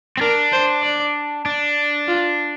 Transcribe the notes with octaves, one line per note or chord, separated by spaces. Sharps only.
C4
D4 A#4
C5
D5
D4
F4